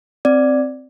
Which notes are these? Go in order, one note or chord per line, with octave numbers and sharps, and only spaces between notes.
C4 D5